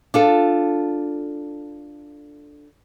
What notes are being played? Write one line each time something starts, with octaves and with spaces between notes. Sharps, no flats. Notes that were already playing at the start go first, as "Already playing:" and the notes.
D4 F4 A4